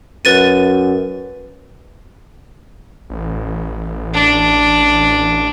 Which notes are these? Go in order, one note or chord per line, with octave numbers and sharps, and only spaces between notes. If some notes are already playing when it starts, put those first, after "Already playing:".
F#2 B4 A6 D#7
A1
D4